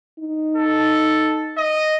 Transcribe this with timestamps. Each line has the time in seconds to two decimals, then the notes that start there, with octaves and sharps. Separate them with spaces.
0.19 D#4
0.57 A4
1.57 D#5